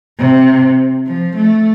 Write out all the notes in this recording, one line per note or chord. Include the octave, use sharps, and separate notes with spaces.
C3
F3
A3